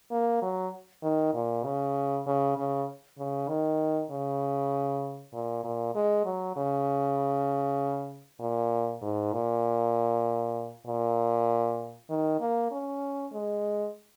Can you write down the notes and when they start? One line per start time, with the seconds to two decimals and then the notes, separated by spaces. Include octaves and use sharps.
0.11 A#3
0.42 F#3
1.03 D#3
1.34 A#2
1.65 C#3
2.26 C#3
2.57 C#3
3.18 C#3
3.48 D#3
4.10 C#3
5.33 A#2
5.64 A#2
5.95 G#3
6.25 F#3
6.56 C#3
8.40 A#2
9.02 G#2
9.33 A#2
10.86 A#2
12.10 D#3
12.40 A#3
12.71 C#4
13.33 G#3